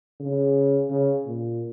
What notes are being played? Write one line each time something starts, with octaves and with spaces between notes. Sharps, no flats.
C#3
C#3
A#2